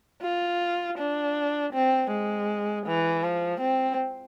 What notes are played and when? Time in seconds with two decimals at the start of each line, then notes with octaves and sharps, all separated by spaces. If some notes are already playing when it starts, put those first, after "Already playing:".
0.23 F4
0.98 D4
1.73 C4
2.11 G#3
2.87 E3
3.24 F3
3.61 C4